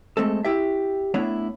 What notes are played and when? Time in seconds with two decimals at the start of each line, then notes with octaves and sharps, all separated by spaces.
0.17 G#3 A3 C4 A4
0.44 E4 G4 E5
1.14 A3 B3 D4 E4 C#5 E5